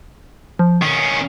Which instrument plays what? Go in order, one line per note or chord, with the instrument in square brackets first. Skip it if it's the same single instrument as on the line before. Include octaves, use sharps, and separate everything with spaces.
[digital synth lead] F3
[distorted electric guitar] D#3 C#4 [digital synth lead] C7